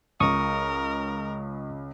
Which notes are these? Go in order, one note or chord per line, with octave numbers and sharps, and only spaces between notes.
C#2 A#4 C#6 D#6